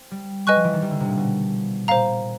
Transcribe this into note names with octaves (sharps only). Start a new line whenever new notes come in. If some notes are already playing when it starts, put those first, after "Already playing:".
Already playing: C4
G3
G3 B4 D#5 G#5 C#6 F#6
F3
E3
D#3
G3
D3
C3
A#2
B2
A#2 C5 F5 A#5